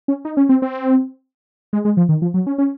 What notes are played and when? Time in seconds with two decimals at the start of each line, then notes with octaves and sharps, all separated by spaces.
0.08 C#4
0.25 D#4
0.37 C#4
0.49 C4
0.62 C4
1.73 G#3
1.85 G#3
1.97 F3
2.09 D#3
2.22 F3
2.34 F#3
2.47 C#4
2.58 C#4